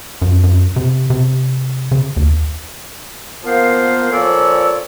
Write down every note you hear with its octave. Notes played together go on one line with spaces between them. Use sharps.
F#2
F#2
C3
C3
C#3
D#2
F3 A#3 B3 A#4 C5 F5
A#2 F3 A4 C#5 D5 E6